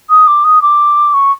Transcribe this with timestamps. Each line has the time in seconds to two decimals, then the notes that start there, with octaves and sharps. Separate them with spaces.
0.10 D#6
0.27 D6
0.44 D#6
0.62 D6
1.14 C#6